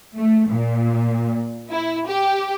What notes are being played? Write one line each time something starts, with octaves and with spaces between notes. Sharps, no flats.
A3
A#2
E4
G4